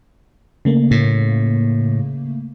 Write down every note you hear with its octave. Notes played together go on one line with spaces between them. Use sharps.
C#3 A3 A#3
A2